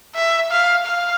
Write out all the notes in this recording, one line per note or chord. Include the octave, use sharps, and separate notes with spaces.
E5
F5
F5